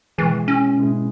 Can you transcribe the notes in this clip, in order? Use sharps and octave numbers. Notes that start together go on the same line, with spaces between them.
B2 E3 G#3 B3 E4 G#4
C#4
B2 G#3 B3 E4 G#4